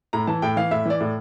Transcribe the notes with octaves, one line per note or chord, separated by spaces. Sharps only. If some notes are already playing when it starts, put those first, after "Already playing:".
A2 A#5
E3 A5
A2 G5
E3 F5
A2 E5
E3 D5
A2